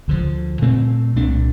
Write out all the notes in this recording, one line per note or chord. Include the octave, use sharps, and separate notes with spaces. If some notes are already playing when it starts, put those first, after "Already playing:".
D2 D3 F3
A#2 A3 C4
C2 A#2 A3 D4